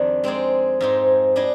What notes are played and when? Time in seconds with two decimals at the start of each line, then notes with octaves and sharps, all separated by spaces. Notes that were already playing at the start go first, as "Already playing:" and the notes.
Already playing: F2 D#3 G3 D4 G#4
0.24 G#3 C4 D#4 G#4 D5
0.81 G#2 F3 G#3 C4 D#4
1.36 G3 D4 G#4 D#5